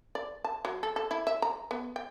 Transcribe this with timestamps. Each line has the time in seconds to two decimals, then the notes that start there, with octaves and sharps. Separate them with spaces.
0.15 D5
0.44 A5
0.65 F#3
0.83 A4
0.96 A4
1.11 E4
1.27 E5
1.42 A#5
1.71 B3
1.96 G5